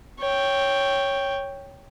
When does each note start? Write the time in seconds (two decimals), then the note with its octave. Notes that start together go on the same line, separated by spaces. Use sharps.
0.20 C#5 G5